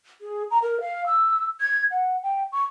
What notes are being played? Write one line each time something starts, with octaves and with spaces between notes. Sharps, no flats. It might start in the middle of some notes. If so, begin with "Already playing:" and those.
G#4
A#5
A#4
F5
E6
G#6
F#5
G5
C#6